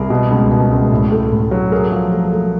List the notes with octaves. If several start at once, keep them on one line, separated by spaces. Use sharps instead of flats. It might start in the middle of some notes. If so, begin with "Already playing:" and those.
Already playing: C2 G#4 A#4
B2
C#2
B2
C#2
A2
A3
A2
F#3
A3 G#4 A#4
F3
A3
A3